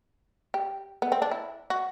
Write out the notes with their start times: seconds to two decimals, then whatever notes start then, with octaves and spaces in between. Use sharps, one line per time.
0.54 G4
1.02 B3
1.12 C4
1.22 D4
1.31 E4
1.70 F#4